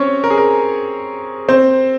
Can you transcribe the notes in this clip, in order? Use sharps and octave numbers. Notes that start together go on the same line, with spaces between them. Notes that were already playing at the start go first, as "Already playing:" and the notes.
Already playing: C4 C#4 C5 C#5
A#4
G#4
A#4
C4 C5